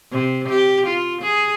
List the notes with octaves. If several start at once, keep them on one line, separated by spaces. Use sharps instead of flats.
C3
G4
F4
G#4